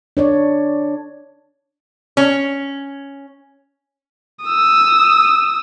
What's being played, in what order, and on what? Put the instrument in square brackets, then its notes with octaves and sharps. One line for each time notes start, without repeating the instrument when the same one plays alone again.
[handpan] D4 C#5 D5
[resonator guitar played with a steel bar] C#4
[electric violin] D#6 E6